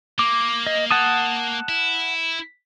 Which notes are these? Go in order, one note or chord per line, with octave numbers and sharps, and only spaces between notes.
A#3 D6
D#5
F#5 A5 D#6
E4